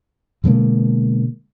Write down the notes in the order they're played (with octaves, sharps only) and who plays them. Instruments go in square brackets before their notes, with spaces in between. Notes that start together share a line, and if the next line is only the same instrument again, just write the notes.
[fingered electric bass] B2 D3 G#3 A#3